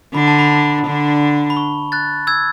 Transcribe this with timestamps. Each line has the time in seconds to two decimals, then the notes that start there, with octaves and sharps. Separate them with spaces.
0.14 D3 D4 B5
0.28 A5
0.39 B5
0.86 D3 D4
1.50 B5
1.57 C#6
1.92 F#6 A6
2.27 E6 G#6